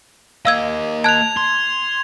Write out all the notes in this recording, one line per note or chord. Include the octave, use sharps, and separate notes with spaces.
A#3 D#5 F5 E6 G#6
A5 F#6 G#6 F7
C6